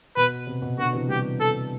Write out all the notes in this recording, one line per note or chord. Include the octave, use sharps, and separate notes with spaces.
B2 B4
C3
B2
B2 D3 F#4
C3 E3
E3 G3 G4
A4